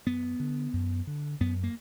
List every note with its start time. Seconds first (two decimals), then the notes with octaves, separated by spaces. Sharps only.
0.07 F#2 B3
0.40 D3
0.73 F#2
1.07 D3
1.40 F#2 B3
1.63 A#3